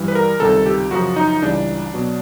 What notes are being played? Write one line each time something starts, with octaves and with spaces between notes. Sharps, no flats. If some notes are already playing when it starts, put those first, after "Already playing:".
Already playing: G2 E3 G3
B4
A#4
C#2 C3 D#3 G3 A4
G4
F#2 C#3 F3 F#4
D#4
C#2 C#3 E3 G3 D4
B2 F#3